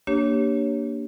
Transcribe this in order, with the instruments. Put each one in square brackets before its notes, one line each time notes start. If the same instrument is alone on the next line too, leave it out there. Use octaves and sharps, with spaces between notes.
[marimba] A#3 D4 G4 C#5